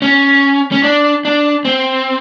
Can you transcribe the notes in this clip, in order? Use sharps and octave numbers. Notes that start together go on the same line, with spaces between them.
C#4
C#4
D4
D4
C4